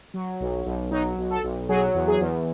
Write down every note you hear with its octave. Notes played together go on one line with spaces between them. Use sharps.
F#3
B1
B1
F#3 D#4
B1
A4
B1
F#3 G#4
E2
G#4
E2